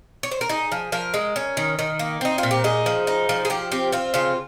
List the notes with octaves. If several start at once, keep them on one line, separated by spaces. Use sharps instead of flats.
C#5
C5
A#4
D#4 G#4
F3
F3 A#4
G#3
C#4
D#3
D#3
A#3
C4 D#4
F4
A#2
G4
D#4 G#4
F3
D#4
F3
G#4
F3 G4
C4 G4
C4 F4
C#3 F4